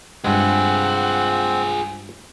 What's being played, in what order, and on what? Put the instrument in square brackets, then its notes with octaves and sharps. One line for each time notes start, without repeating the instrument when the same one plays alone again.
[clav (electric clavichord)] G2 G#3 [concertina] C4 [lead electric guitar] F4 G#4 [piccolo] F#5